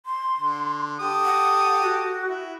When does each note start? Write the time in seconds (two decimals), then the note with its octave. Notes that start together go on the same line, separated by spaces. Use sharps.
0.06 C6
0.37 D3
1.00 G4 A4 D#6
1.24 F#5
1.81 F#4
2.27 E4